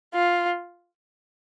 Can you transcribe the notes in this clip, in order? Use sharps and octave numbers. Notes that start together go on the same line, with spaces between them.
F4